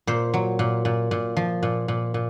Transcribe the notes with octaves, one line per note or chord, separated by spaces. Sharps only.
A#2 C5
F#3
A#2
A#2
A#2
F3
A#2
A#2
A#2